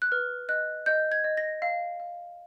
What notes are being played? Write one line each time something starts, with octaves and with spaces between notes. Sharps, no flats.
F#6
B4 F6
D#5 F#6
D#5 G6
G#6
D#5
A#6
F5
F5